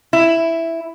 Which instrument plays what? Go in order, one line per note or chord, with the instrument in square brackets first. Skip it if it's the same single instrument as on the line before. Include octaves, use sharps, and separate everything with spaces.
[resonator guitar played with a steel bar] E4